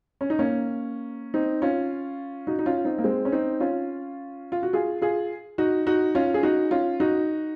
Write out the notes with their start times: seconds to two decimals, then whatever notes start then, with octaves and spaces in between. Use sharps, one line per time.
0.21 C#4
0.30 D#4
0.39 A#3 C#4
1.34 C4 D#4
1.62 C#4 F4
2.47 D#4 F#4
2.59 D#4
2.66 C#4 F4
2.85 C4 D#4
2.98 A#3
3.04 G#3 C4
3.25 C#4
3.32 C4 D#4
3.60 C#4 F4
4.52 F4
4.63 F#4
4.73 F4 G#4
5.02 F4 G#4
5.58 D#4 F#4
5.86 D#4 F#4
6.15 C#4 F4
6.34 G#4
6.43 D#4 F#4
6.71 C#4 F4
7.00 D#4 F#4